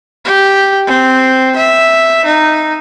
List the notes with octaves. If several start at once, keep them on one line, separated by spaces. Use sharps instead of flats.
G4
C4
E5
D#4